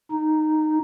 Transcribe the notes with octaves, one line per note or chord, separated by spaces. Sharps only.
D#4